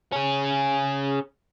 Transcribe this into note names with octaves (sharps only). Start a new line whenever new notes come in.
C#4 G#4